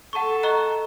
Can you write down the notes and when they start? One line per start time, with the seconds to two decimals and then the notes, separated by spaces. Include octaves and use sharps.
0.13 A4 F#5 A5 C#6
0.43 D#5 A#5 C#6 F#6